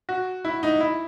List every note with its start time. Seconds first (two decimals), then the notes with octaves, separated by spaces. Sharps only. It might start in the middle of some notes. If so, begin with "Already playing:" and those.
0.09 F#4
0.45 E4
0.63 D#4
0.80 E4